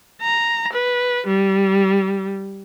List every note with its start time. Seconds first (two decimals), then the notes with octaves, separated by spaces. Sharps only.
0.22 A#5
0.73 B4
1.27 G3